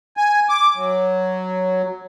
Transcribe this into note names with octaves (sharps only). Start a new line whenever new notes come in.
G#5
D6
F#3